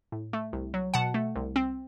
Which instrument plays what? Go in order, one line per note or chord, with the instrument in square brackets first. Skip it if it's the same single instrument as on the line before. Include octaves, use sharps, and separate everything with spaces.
[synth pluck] A2
A3
C2
F#3
B2 F#5 A5
A3
C2
C4